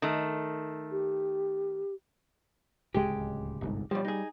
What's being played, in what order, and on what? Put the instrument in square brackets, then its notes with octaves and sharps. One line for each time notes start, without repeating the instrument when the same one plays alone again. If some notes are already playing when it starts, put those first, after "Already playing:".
[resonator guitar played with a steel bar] D#3 A3
[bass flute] G4
[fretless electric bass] D1 C#2 G#3 [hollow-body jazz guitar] G4
[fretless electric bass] G1 C2 G#2
[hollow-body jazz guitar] B1 F3 [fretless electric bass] G3
[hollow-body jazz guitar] D#4 G#4